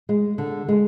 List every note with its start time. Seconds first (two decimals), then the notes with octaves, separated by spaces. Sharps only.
0.09 G#3
0.38 D3
0.68 G#3